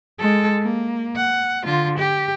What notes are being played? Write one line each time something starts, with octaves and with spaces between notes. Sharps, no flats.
G#3 A4
A#3
F#5
D3 F4
G4